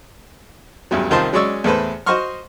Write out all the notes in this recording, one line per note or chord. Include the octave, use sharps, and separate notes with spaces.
A1 E2 G2 F#3
C2 D#3 F4 C5 A5 C6
F#3 G#3 C#4 D5 C#6 E6
E2 A2 A4 B4 C5
F#4 C5 D#5 C6 C#6 F6